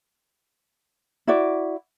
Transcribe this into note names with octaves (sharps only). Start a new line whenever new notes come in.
E4 F#4 D5